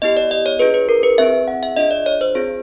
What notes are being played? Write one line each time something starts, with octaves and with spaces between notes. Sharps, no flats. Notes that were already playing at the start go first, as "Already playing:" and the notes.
B3 E4 G4 D#5
D5
D#5
C#5
D4 F4 G#4 B4
B4
A#4
B4
C4 E4 G#4 E5
F#5
E5
D4 F4 G#4 D#5
D5
C#5
C5
C4 F4 G#4